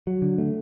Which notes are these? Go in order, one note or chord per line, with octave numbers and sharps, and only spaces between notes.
F#3
D3
A3